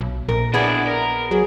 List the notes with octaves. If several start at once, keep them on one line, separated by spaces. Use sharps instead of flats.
B1
A#1 A#4
B3 D4 E4 G#4 D5
A#4
F#3 G#4